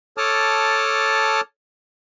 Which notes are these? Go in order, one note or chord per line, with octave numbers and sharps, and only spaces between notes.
A4 C#5 A5 D6 D#6 F6